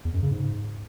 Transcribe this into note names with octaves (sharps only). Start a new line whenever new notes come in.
E2
F#2
C#3
G#2